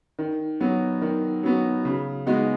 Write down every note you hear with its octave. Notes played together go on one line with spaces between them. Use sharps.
D#3
F#3 B3 F#4
D#3
F#3 B3 F#4
C#3
G#3 B3 D#4 F#4